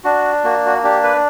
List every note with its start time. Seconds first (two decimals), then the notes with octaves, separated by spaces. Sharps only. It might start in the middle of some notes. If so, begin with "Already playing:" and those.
0.04 D4 F#4
0.44 A#3 F#4
0.66 F#4
0.84 D4 G4
1.03 B4